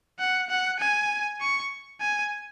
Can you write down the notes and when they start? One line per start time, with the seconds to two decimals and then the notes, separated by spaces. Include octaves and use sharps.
0.19 F#5
0.50 F#5
0.80 G#5
1.41 C#6
2.01 G#5